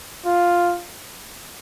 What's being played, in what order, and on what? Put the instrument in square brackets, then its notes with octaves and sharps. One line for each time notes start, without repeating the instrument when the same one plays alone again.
[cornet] F4